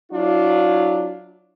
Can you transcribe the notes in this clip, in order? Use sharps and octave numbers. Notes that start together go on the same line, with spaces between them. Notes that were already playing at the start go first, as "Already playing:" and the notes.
F#3 D4 E4 F4